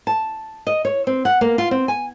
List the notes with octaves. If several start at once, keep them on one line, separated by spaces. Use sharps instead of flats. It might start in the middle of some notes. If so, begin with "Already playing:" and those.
A5
D#5
C#5
C4
F#5
A#3
F4
C4
G#5